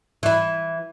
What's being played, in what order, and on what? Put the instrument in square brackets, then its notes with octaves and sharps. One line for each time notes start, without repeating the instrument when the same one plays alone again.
[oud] E3 E4